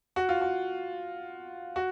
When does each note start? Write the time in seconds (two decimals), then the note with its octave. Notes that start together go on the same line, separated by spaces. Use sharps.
0.16 F#4
0.29 F4
0.41 F#4
1.76 F#4